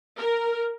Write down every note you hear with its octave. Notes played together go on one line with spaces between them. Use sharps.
A#4